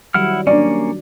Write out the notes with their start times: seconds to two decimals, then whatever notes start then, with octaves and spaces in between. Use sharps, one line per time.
0.14 D#3 F#3 G3 E4 F#5 F6
0.47 A#3 C#4 D4 D5